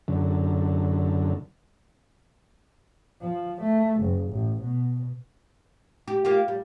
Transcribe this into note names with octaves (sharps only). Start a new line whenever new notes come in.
F#2 D3
F3
A3
F#1
A1
B2
G4
A#3 F4 G4
G3